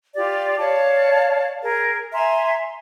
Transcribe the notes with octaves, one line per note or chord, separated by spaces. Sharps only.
F4 G4 D5
C#5 D5 F5 A5
G#4 A#4
E5 G#5 A#5 C6